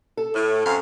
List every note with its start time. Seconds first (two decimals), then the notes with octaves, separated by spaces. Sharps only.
0.17 A4
0.33 A2
0.64 F#2 C4 F5